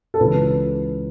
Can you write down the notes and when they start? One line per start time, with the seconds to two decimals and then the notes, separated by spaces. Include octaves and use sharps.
0.14 A4
0.20 C#2 C#3 E3 B4